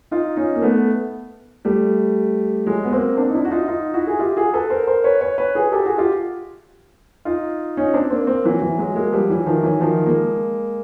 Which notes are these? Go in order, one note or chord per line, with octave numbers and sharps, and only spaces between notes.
D#4 F4
C#4 D#4
A#3
A3 B3
G3 A3
F#3 G#3
B3
A#3 C4
C4 D4
D#4
D4 E4
F#4
D#4 F4
D#4 F4
E4 F#4
G#4
F4 G4
F#4 G#4
A4 B4
A#4 C5
A#4 C5
B4 C#5
B4 C#5
B4 C#5
F#4 G#4
G4 A4
F#4 G#4
F4 G4
D#4 F4
C#4 D#4
C4 D4
A#3 C4
A#3 C4
E3 F#3
E3 F#3
F#3 G#3
G#3 A#3
F3 G3
E3 F#3
D#3 F3
E3 F#3
D#3 F3
G#3 A#3